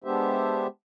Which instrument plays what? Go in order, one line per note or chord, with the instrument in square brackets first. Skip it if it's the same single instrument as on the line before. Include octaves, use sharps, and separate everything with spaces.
[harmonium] G#3 B3 D4 G4 C5 E5